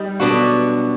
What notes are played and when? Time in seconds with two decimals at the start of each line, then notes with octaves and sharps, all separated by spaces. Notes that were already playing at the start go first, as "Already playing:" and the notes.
Already playing: G3 D#4
0.20 B2 F#3 B3 D4 F#4